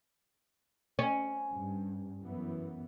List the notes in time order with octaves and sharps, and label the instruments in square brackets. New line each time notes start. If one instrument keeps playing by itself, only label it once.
[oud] C#4
[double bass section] G2
F#2 E3 B3